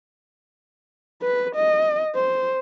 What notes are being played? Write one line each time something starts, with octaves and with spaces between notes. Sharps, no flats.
B4
D#5
C5